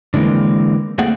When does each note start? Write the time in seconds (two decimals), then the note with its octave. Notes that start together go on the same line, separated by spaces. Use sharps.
0.14 D3 E3 G#3 A#3 C4
0.98 A3 A#3 C4 G#4 F#5